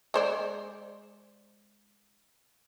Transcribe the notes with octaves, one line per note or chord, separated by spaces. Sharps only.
G#3 C5 D5